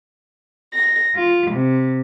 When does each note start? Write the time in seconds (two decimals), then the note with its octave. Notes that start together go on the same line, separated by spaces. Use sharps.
0.73 A#6
1.14 F4
1.51 C3